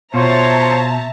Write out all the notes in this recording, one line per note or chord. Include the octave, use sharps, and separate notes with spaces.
B2 F4 C5 C#5 E5 A5 A#5